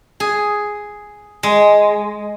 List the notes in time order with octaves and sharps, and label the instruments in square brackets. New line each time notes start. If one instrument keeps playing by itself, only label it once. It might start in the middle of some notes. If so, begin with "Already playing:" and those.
[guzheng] G#4
G#3